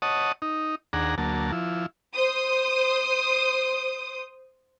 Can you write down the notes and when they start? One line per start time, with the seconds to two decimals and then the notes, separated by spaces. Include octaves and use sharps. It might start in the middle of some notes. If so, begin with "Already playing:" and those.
0.02 C#5 D#5 F#5 A5 D#6
0.42 D#4
0.93 D#2 D4 G#4 F#5 A#5
1.18 D2 F#3 A#3 A5
1.52 F3 E4
2.14 C5 D#6